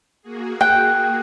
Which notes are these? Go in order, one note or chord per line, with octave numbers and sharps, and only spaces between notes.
A#3 F#4 G#4
G5 F#6 G6